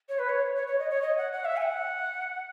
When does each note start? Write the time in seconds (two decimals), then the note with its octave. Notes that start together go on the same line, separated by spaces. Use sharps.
0.09 C#5
0.19 B4
0.29 C#5
0.55 C#5
0.67 C#5
0.79 D#5
0.90 C#5
1.02 D#5
1.17 F#5
1.33 F#5
1.45 E5
1.57 G#5
1.61 F#5